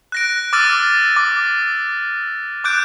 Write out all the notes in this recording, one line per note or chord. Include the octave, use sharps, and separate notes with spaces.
F#6 A#6 D7
D6 E6 F6 A6 D#7
D6
D6 F#6 G6 D7